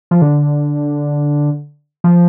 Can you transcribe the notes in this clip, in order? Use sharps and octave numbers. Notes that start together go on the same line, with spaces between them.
F3
D3
F3